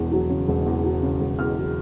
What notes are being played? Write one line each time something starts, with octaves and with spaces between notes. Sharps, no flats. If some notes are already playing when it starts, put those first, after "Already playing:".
Already playing: E1 E2
F#3
C#3
E1
E2
F#3
C#3
E1
E2 F6
F#3